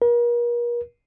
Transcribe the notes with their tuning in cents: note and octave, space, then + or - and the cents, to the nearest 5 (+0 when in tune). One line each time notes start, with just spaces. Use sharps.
A#4 +40